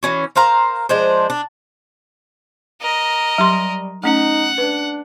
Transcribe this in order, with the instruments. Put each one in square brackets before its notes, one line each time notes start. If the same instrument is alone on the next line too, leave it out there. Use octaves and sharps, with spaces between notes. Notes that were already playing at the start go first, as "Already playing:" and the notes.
[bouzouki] E3 C#4 F#4
A#4 C5 F5 A#5
F3 G#3 D4 C5
D4
[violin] A#4 D#5
[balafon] F#3 G4 C6 [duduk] G3
[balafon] A3 C#4 [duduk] D#4 [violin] F#5
[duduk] D4 [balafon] B4